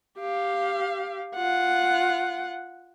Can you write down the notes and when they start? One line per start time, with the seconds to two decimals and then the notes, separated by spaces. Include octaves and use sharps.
0.19 G4 F5
1.35 F4 F#5